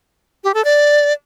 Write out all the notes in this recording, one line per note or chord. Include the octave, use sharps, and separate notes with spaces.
G4
A4
D5